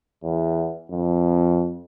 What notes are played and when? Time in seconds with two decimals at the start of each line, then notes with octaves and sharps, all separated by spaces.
0.24 E2
0.91 F2